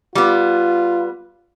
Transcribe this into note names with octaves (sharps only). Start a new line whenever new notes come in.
G3 B3 F4